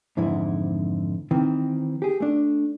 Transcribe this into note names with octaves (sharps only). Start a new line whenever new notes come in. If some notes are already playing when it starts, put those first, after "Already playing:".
F2 G#2 D3 E3 E4
D#3 E3 C4
G4 G#4
A3 D4